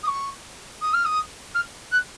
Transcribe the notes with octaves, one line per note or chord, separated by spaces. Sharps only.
D#6
C#6
D#6
F6
D#6
F6
F#6